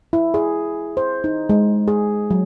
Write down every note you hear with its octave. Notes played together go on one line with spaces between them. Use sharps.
E4
G#4
C5
D#4
G#3
G#4
F#3